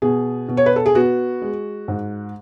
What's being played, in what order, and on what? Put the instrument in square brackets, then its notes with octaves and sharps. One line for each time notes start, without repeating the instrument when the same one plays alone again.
[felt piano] B2 G#4
B2
C#5
B4
A4
G#4
B3 F#4
G#3
G#2